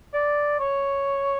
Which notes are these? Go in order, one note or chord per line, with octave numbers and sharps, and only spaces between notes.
D5
C#5